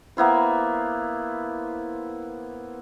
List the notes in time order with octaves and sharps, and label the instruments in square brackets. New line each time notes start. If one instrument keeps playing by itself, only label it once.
[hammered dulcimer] A#3 B3 E4 C5